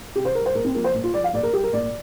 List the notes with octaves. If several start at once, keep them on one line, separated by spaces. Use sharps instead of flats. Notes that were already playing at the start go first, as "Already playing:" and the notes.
C3 G4
C5
G3 A#4
C5
A#2 A#4
C4
F3 A#3
C5
A#2
F4
F3 D5
F5
A#2 D5
A#4
G3 G4
A#4
A#2 D5